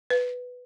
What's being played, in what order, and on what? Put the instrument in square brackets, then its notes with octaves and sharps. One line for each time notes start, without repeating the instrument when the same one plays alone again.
[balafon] B4